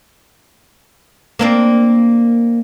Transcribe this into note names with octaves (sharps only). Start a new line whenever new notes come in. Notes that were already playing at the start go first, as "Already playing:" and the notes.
A#3 C4 D4